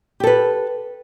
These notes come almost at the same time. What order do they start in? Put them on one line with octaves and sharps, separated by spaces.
G4 A4 B4